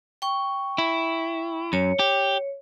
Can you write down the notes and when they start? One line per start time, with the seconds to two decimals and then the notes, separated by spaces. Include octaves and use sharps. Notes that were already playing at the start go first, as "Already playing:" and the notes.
0.22 G5 C#6
0.78 E4
1.73 F#2 C#5
1.99 G4